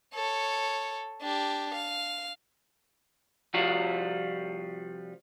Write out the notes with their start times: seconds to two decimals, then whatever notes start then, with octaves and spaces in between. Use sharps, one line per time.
0.14 A4 C#5
1.22 D4 G4
1.74 F5
3.54 C2 F3 G3 F4 F#4